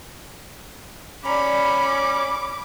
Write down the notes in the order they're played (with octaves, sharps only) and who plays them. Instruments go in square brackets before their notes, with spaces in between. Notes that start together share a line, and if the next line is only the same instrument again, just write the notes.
[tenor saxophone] C#4 [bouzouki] D5 A#5 [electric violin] B5 [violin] D6